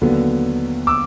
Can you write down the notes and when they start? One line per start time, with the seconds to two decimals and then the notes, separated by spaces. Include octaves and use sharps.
0.01 D#2 D3 F#3 B3
0.87 D6 E6